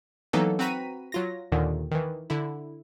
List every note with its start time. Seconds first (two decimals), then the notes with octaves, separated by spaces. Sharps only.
0.33 E3 F#3 A#3 B3 D#4 A4
0.59 C4 F#4 B4 A#5 B6 D#7
1.12 F#3 F4 A#6
1.52 D#2 A#2 D3 D#3
1.91 D#3 E3
2.30 D3 E4